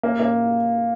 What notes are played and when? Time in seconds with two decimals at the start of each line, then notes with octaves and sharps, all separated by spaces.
0.03 A#3
0.20 A#3